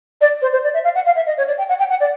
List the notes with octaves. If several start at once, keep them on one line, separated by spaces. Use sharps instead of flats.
D5
C5
C5
D5
E5
F5
F#5
F5
E5
D#5
C#5
D5
G5
F#5
G5
F#5
D5